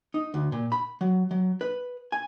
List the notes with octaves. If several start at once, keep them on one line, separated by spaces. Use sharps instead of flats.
D#4
D2
A#2
B5
F#3
F#3
B4
G#5